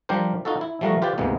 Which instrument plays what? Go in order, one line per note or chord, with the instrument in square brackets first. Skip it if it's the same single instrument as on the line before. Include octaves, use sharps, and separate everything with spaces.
[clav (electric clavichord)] F3 G3 D4 G4 A#4 C5
D#4 F4 F#4 A4
E4
F3 G3 A3 F#4 A#4 D#5
F4 G4 B4 C5 D5
D2 G#2 C3 G#3 A#3 B3